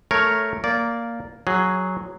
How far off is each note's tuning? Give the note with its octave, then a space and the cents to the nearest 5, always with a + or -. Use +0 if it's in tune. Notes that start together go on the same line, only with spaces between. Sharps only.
A3 +0 A#4 -5 C#5 +0
A#3 -5 D5 -15
F#3 +0 G#4 +0